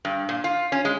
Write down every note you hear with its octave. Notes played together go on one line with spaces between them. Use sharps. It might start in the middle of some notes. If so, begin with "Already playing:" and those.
G2
A#2
F4
C#4
G#3